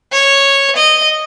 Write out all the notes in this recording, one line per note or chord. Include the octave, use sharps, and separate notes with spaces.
C#5
D#5